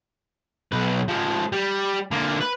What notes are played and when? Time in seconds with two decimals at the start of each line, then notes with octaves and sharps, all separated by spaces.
0.72 B1 B4
1.08 F3 G#3
1.53 G3
2.11 D3 A#3
2.41 B4